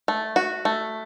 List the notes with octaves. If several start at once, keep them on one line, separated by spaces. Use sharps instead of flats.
A3
F#4
A3